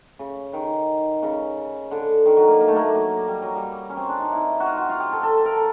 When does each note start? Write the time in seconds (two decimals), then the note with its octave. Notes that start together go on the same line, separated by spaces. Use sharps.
0.19 C#3
0.53 D#3
1.23 C#3
1.91 D3
2.26 D#3
2.37 F#3
2.48 A#3
2.60 A#3
2.68 A3
2.76 A#3
2.94 F#3
3.28 G3
3.42 F#3
3.56 G3
3.90 C#4
3.97 C4
4.09 D4
4.20 D#4
4.32 E4
4.60 F#4
4.66 F4
4.77 F#4
4.89 F4
5.00 G4
5.12 A4
5.23 A4
5.45 A#4
5.56 A4